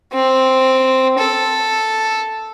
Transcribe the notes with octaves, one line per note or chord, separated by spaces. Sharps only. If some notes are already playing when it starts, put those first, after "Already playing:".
C4
A4